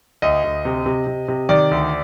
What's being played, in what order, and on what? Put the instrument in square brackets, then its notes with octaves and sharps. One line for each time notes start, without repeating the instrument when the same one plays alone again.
[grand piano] D2 D#5
D2
C3
C3
C3
C3
D#3 D5
D2